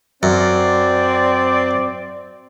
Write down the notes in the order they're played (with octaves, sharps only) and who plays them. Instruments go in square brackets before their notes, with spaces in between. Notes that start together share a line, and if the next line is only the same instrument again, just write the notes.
[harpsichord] F#2 [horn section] C4 D5